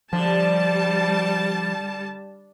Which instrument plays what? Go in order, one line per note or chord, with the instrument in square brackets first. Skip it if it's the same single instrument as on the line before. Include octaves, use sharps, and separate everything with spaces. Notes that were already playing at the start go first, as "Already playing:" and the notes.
[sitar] D3 [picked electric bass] F3 [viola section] G3 A5